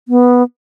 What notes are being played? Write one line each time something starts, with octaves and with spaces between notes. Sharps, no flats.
B3